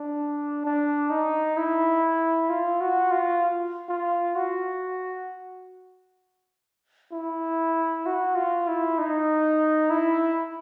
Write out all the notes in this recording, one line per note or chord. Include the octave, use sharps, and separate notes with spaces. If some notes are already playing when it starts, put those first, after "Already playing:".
Already playing: D4
D4
D#4
E4
F4
F#4
F4
F4
F#4
E4
F#4
F4
E4
D#4
E4